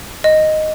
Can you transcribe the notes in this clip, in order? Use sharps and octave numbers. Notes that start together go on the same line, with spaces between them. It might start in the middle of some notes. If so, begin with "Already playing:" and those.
D#5